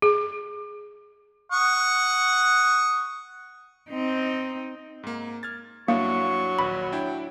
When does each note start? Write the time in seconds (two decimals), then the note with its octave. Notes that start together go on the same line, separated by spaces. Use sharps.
0.02 G#4
1.52 F#5 C#6 D#6
3.90 C4 D#4
5.03 G#2 A#3
5.43 F6 G#6 A6
5.88 G2 F#3 A#3 D4 E4 C#6
6.59 A#1 D#2 B4 B5
6.92 D4 E4 G5